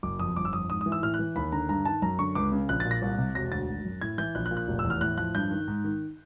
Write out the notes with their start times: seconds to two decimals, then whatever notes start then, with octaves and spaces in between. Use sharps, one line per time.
0.03 F#1 D6
0.20 F2 D#6
0.36 G1 D6
0.45 E6
0.53 F2 D#6
0.69 G#2 D#6
0.81 E3 D#6
0.92 E6
1.02 A2 F6
1.14 F#6
1.19 E3
1.36 D#2 B5
1.52 D3 A#5
1.69 G2 A#5
1.85 D#3 A5
2.02 F#2 A#5
2.19 D3 C#6
2.35 C#2 D6
2.52 C#3
2.69 A#1 F#6
2.80 A6
2.86 A#2
2.91 A#6
3.02 C2
3.18 C3
3.35 E1 A#6
3.52 D2 A6
3.68 G#1
3.85 F#2
4.01 A2 G#6
4.18 E3 G6
4.35 A#1 F#6
4.46 F#6
4.51 A#2
4.57 F#6
4.68 F1
4.79 E6
4.84 E2
4.90 F6
5.01 A2 F#6
5.17 F3 F#6
5.35 G2 G6
5.51 D#3
5.67 G#2
5.84 D#3